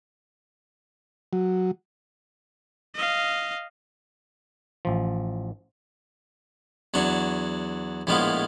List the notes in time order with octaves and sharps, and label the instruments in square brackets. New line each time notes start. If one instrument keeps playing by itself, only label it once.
[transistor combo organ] F#3
[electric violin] D#5 F5
[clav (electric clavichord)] A1 F3
[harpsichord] E2 F#3 D4 C#6
A#1 A2 F3 G#3 B3 F4